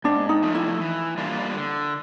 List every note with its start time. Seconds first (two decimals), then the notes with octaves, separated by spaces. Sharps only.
0.04 G#2 D4
0.29 D#4
0.42 F3 A3
0.55 E4
0.80 E3
1.18 G3 A#3 D4 F4
1.55 D3